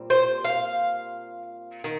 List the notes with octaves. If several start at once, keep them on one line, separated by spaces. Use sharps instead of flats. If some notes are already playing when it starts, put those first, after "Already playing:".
Already playing: A#2 G3 C4
C5
F5
D#3